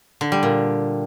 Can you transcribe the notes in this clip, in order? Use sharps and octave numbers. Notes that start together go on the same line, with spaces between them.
D3
G3
A#2